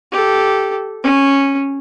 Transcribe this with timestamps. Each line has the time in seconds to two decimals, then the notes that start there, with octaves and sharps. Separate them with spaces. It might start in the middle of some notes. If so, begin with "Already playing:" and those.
0.12 G4 A4
1.03 C#4